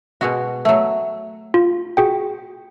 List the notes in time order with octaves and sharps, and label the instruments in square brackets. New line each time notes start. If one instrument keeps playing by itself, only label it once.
[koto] B2 G#3 F#4
F#3 A3
[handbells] F4
F#4 G#4 G5